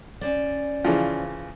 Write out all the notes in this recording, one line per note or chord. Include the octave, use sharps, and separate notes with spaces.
C#4 C5 D5
C#3 E3 F3